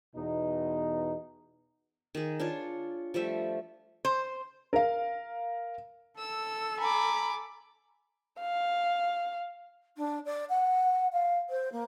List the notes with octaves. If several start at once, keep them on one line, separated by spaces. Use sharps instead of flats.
E2 B2 D#4
D#3 G#4
D4 F4 C#5
F3 G3 A3 E5
C5
A#4 F5
A4 E6
G#5 A#5 B5 D6
F5
D4
D5
F#5
F5
C5
A#3